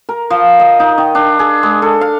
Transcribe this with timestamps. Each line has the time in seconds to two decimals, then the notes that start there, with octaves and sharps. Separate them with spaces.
0.09 A#4
0.30 F3
0.60 D#5
0.80 D#4
0.98 D#3
1.15 D4
1.39 G#4
1.63 G#3
1.82 A4
2.01 F5